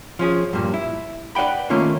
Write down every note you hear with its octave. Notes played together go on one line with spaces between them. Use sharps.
F3 C#4 G#4
G2 A#2
E4
B4 D5 F#5 G5 B5
D#3 A3 A#3 C#4 F4